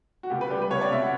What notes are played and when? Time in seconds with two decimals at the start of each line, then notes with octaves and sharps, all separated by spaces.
0.23 F#4
0.30 C#2 G4
0.41 B4
0.50 G3 G4
0.62 B4
0.71 C#2 C#5
0.81 D5
0.91 C#2 E5
1.02 F#5